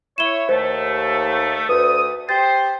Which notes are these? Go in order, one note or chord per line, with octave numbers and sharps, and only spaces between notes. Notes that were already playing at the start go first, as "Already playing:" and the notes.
E4 C#5 E7 G7
D#2 A3 C5
D2 B4 D#6
G4 C5 A6